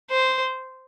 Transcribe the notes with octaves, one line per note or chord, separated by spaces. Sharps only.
C5